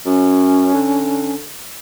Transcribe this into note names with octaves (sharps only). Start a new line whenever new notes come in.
F#2 C#4
D3